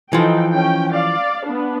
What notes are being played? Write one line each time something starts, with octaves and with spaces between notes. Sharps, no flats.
E3 F3 D#4 A4 G5
C#4 G5
D5 F5
B3 D4